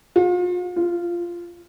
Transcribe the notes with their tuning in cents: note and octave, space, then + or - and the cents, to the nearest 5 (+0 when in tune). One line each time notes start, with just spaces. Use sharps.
F4 +40
F4 -10